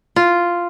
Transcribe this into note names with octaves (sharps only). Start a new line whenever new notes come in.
F4